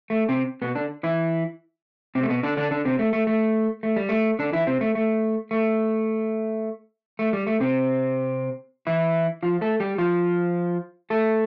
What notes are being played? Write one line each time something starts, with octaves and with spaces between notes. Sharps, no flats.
A3
C3 C4
B2 B3
D3 D4
E3 E4
C3 C4
A3
B2 B3
D3 D4
D3 D4
D3 D4
C3 C4
A3
A3
A3
A3
G3
A3
D3 D4
E3 E4
C3 C4
A3
A3
A3
A3
G3
A3
C3 C4
E3 E4
F3 F4
A3 A4
G3 G4
F3 F4
A3 A4